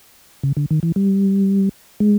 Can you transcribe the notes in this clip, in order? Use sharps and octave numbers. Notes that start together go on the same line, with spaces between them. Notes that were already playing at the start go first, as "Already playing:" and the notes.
C#3
D3
D#3
E3
G3
G#3